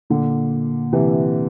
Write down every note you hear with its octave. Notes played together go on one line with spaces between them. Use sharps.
A#2 D3
C3 E3